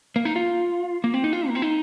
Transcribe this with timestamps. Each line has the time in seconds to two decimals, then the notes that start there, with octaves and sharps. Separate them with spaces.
0.16 A#3
0.25 D#4
0.36 F4
1.04 A#3
1.14 C4
1.24 D#4
1.33 F4
1.48 A#3
1.55 C4
1.62 D#4